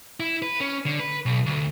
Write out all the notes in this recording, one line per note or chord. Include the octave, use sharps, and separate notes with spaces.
E4
B4
C#4
D3
B4
B1
D2